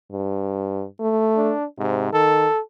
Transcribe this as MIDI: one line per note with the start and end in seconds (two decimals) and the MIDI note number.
0.12 0.85 43
1.00 1.53 57
1.37 1.65 62
1.78 2.11 44
1.78 2.10 48
2.13 2.47 51
2.13 2.60 69